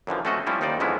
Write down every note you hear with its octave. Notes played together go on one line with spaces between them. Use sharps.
F#2 D3 E3 F3
A3 C4 C#4 F#4 A4 D#5
F3 G3 C4 C#4 E4
D#2 D#3 D#4 C5 D5
F2 D3 G#3 B3 C#4 E4